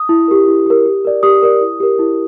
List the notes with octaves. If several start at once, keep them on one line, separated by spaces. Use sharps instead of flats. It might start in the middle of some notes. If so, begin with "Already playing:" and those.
Already playing: D#6
E4
G4 A#4
E4
G4 A#4
G4
A#4 D5
G4 D#6
A#4 D5
E4
G4 A#4
E4